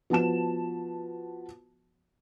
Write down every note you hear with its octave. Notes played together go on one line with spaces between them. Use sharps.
F3 B3 F#4 A5 E7